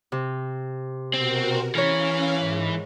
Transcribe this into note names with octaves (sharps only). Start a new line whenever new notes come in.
C3
B2 C4 F#4 A#4
E3 C#4 A#4 C#5 F5
G#2 G#3